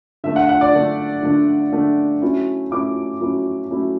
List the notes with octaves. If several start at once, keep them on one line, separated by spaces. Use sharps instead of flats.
D3 A3 D4 E5
F#5
F#5
D5
D3 A3 D4
D3 A3 D4
D3 A3 D4
F#3 A3 C#4 E4
F#3 A3 C#4 E4 D6
F#3 A3 C#4 E4
F#3 A3 C#4 E4